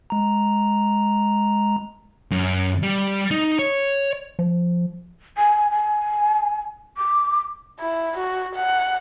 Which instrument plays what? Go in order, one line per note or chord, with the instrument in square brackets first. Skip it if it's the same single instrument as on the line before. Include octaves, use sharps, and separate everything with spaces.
[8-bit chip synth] G#3 A#5
[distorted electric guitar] F#2
G3
D#4
C#5
[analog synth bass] F3
[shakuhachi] G#5
G#5
D6
[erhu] E4
F#4
F#5